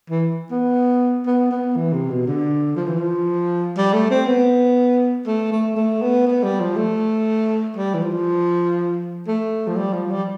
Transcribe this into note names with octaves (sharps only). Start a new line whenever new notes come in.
E3
B3
B3
B3
E3
C3
B2
D3
F3
E3
F3
G3
A3
C4
B3
A3
A3
A3
B3
B3
G3
F3
A3
G3
E3
F3
A3
F3
G3
F3
G3